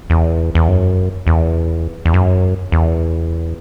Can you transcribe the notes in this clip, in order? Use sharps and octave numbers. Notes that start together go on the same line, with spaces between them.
E2
E2
F#2
E2
E2
F#2
E2